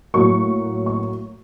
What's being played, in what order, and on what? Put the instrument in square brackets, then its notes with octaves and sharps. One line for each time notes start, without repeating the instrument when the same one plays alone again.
[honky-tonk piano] A2 F#3 A#3 C#6
C#6